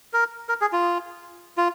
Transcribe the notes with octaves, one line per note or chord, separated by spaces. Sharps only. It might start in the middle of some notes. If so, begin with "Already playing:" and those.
A#4
A#4
G#4
F4
F4